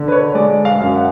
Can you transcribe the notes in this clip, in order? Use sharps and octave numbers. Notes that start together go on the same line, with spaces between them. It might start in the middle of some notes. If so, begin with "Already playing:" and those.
Already playing: D3
B4
C#5
G#3 D5
F5
F#2
F#5